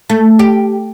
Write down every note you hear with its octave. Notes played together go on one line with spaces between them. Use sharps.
A3
G4